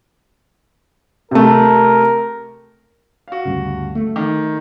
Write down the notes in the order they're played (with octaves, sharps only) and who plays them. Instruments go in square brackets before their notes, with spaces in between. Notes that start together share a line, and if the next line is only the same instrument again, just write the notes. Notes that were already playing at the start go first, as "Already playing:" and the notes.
[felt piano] C3 A3 [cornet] A#4
[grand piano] F#4 F5
[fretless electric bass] D2 G2 C#3
A3
[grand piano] D#3